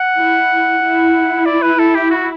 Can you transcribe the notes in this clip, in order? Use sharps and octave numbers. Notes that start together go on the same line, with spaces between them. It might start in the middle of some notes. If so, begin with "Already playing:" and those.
Already playing: F#5
E4
E4
D5
B4
A4
G4
F#4